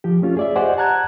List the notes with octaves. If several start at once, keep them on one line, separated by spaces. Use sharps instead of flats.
F3 G4
A3 C#4 F4
G#4 D5 E5
G4 C5 D5 D#5 F#5 G#5
F#5 A5 A#5 F#6 G#6